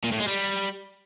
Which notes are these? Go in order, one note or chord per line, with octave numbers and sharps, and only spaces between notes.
A#2
A2
G#3
G3